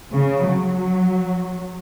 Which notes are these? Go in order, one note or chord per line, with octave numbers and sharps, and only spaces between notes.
C#3
F#3